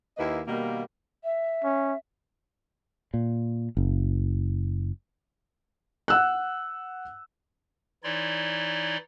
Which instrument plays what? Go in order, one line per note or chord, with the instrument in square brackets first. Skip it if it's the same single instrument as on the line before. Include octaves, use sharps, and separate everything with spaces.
[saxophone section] D#2 A#3 E4 B4 D#5
B2 D#3 G3 A#3
[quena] E5
[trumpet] C#4
[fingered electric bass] A#2
F#1
[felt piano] F#5 E6 F#6
[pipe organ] E3 D#4 E4 C#5 D5 C6